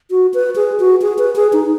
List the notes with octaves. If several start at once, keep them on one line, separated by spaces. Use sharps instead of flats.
F#4
B4
G#4
F#4
G#4
B4
G#4
D#4